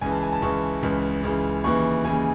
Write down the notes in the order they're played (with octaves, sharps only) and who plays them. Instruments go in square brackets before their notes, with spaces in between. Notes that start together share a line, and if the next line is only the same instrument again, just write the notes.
[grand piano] C#2 C#3 E3 G#5
A5
G#5
A5
C#2 C#3 E3 C#6
C#2 C#3 E3
C#2 C#3 E3
D#2 C#3 E3 C#6
D#2 C#3 E3 G#5